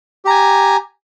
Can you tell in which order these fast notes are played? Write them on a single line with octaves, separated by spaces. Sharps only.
G4 A#5 G#5